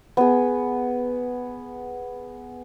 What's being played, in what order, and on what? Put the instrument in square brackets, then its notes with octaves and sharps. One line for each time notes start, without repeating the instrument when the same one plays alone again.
[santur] B3 G#4